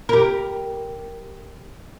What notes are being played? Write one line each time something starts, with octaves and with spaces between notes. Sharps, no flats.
G4 A#4